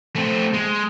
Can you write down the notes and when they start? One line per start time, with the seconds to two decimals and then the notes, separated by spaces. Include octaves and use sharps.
0.16 A3 C4
0.54 G#3